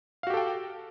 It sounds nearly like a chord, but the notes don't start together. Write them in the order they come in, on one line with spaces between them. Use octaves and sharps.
F5 F#4 G4 A4 G5